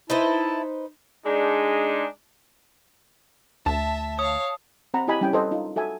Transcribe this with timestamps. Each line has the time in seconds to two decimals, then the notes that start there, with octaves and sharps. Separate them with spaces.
0.10 D#4 E4 B4 C5 A5
1.26 G#3 D4 D#4
3.66 D2 E5 A5
4.19 C#5 F5 D#6
4.94 C4 F#5 A#5 B5
5.08 E4 G4 D#5 G#5 B5
5.21 G3 C#4 E4 G5
5.33 A4 B4 C5 D#5
5.51 D#4 F4
5.76 F#4 A4 E5 G#5